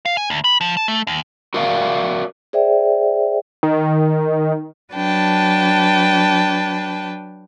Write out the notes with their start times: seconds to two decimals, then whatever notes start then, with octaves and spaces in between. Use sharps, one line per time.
0.06 F5
0.17 G#5
0.30 D2
0.44 B5
0.61 F3
0.77 A5
0.88 A3
1.07 D#2
1.54 F#4 A#4 D5 E5 F5
2.53 G#4 C5 D5 E5 G5
3.63 D#3
4.93 F#3 D4 B4 G5 A5